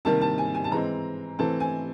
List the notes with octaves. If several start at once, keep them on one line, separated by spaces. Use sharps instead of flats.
C3 D#3 G3 A#3 A5
A5
G#5
G#5
A5
E3 G#3 C4 A#5
E3 A3 C4 A5
G#5